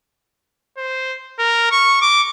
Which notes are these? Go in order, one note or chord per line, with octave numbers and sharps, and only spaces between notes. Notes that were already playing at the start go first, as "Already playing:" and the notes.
C5
A#4
C#6
D6